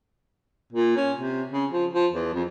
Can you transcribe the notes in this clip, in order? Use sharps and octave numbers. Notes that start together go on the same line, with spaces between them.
A#2
C#4
C3
C#3
F3
F3
E2
F2